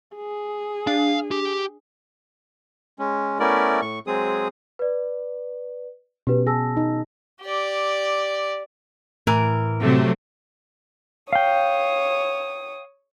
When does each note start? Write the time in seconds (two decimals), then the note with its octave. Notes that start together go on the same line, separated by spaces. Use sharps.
0.16 G#4
0.87 D4 F5
1.31 G4
2.99 G#3 C#4
3.40 A3 B3 C#4 E4 A#4 D5
3.82 A2 C#6
4.07 F#3 G#3 C4 G#4 D#6
4.79 B4 D5
6.27 B2 C#4 G4 B4
6.47 G#4 A5 E6 A#6
6.77 D#4
7.42 G4 D5
9.27 A2 E3 A#4
9.81 C3 F#3 A3
11.33 C#5 F5 G5 D#6